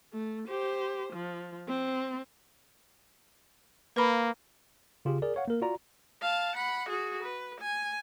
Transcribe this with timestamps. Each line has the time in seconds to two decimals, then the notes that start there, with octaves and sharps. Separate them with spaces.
0.13 A3
0.48 G4 C5
1.13 F3
1.68 C4
3.97 A#3 B4 F5 B5
5.05 C#3 F4 G4 G#4
5.22 G#4 A#4 D5
5.36 C#5 F5 F#5
5.48 A#3 A#4
5.62 F4 F#4 D5 A#5
6.21 F5 A5
6.56 F#5 B5
6.89 F#4 G#4
7.23 B4
7.60 G#5